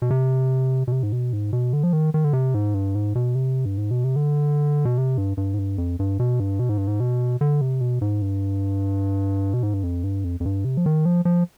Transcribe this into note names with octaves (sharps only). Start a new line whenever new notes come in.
B2
C3
B2
C3
G#2
B2
G#2
B2
D3
F3
D#3
D#3
D3
C3
G#2
G2
G#2
B2
C3
G2
G#2
B2
C3
D3
B2
C3
G2
G2
G#2
G2
F2
G2
B2
G2
B2
G#2
G2
G#2
B2
D3
C3
B2
G#2
G2
B2
G#2
G2
F2
G2
F2
F2
G2
C3
F3
D#3
F3
F3